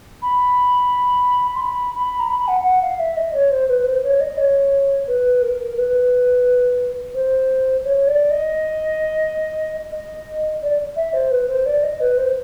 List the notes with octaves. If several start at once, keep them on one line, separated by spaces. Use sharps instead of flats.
B5
C6
B5
B5
A#5
B5
F#5
F#5
F5
E5
D#5
C#5
C5
B4
C5
C#5
D#5
C#5
B4
A#4
B4
C5
C#5
D5
D#5
D#5
D5
E5
C5
B4
C5
D5
D#5
B4
C5